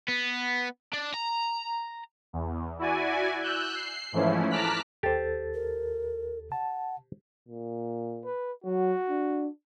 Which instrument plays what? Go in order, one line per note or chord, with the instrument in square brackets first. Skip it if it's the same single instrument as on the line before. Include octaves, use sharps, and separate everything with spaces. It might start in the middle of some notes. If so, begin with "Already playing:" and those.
[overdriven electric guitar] B3
D4
A#5
[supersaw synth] E2
E4 F#4 D5 G#5
E6 F#6 G6
C7
G#2 E3 F3 A3 C#4 E4
A5 A#5 D6 F6 F#6 B6
[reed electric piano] D#2 A4 A6 [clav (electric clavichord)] G4 C5
[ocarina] A#4
[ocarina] F#5 [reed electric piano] A5
[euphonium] A#2
[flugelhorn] B4
[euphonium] F#3 [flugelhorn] F#4
[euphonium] D4